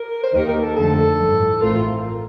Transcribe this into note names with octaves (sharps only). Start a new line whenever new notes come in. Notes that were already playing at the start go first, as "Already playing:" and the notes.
Already playing: A#4
C5
D#2 D#3 A#3 D#4 G4 A#4
A#4
A4
F2 D3 A3 A4
A1 G2 F3
A1 A2 A3 C4 F4 A#4
A#4